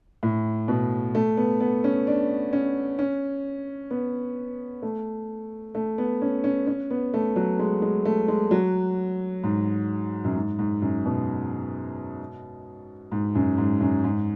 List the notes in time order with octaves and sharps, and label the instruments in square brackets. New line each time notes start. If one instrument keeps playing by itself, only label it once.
[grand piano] A2
B2
A3
B3
B3
C#4
D4
C#4
C#4
B3
A3
A3
B3
C#4
C#4
C#4
B3
A3
F#3
G#3
G#3
A3
G#3
F#3
G#2
F#2
G#2
G#2
F#2
B2
G#2
F#2
G#2
F#2
G#2